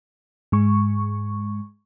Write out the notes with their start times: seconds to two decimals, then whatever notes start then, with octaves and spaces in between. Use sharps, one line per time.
0.52 G#2 G#3 C#6